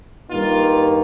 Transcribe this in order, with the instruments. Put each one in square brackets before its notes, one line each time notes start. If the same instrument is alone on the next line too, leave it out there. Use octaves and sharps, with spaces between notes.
[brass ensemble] G2 D#3 A#3 D#4 F4